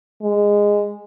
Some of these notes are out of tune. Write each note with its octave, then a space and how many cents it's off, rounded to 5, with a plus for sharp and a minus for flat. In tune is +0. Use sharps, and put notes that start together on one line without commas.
G#3 -15